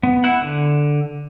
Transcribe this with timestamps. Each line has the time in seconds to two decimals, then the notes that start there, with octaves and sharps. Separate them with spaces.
0.03 B3
0.24 E4 F#5
0.42 D3